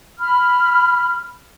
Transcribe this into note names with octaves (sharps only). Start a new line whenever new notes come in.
B5 F6